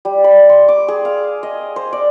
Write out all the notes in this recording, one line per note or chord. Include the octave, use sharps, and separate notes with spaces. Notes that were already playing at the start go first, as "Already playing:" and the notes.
G3
B5
C6
D6
G#4
F5
D#5
C5
D5